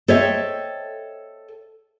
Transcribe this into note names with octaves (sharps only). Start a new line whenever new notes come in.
A4 C5 C#5 D#5 E5 G5